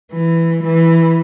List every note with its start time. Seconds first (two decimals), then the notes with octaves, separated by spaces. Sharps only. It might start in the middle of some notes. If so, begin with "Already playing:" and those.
0.12 E3
0.63 E3